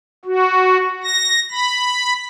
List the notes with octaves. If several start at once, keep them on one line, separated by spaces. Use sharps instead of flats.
F#4
A#6
B5